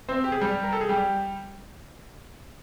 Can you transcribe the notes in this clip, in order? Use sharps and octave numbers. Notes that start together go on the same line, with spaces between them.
C4 C5
G4
G#4
G3 G4
A#4
A4
G#4
G3 G4